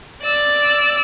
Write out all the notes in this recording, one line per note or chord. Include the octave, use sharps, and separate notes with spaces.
D5 E6